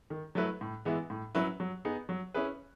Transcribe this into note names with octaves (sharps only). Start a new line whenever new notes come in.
D#3
F#3 A3 E4 B4
A2
E3 G#3 B3 E4
A2
F#3 C#4 E4 B4
F#3
B3 D#4 G#4
F#3
C#4 E4 G#4 B4